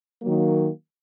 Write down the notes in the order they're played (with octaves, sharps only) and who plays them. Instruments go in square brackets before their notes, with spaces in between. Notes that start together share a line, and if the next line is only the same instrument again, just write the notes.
[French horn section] D#3 F#3 A#3